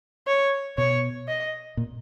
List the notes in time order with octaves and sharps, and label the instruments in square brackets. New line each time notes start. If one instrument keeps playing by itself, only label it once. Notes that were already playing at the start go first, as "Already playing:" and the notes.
[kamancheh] C#5
[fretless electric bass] B2 [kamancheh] C#5
[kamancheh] D#5
[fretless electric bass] A#2